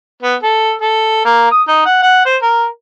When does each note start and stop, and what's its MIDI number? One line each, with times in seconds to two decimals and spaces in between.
0.23 0.36 59
0.43 0.73 69
0.82 1.25 69
1.25 1.47 58
1.51 1.62 87
1.68 1.85 63
1.86 2.02 78
2.03 2.21 78
2.26 2.37 72
2.42 2.66 70